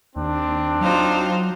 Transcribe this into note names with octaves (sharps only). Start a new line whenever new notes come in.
D#2 C4 D4
F#3 D#4 F4 C5